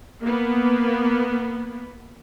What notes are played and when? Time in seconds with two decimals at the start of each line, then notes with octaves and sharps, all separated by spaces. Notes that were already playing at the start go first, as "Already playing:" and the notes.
0.22 A#3 B3